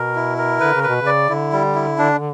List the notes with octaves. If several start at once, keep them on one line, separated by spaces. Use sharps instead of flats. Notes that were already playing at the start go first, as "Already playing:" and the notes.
Already playing: B2 A#4
E4
A#4
D3 B4
C#3
B2 B4
C#3 D5
D3 E4
G3
E4
D4